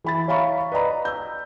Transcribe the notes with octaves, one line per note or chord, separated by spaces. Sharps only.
E3 B5 A6
C#5 E5 F5 A#5 B5 C#6
B4 D5 D#5 A#5 B5
E6 G6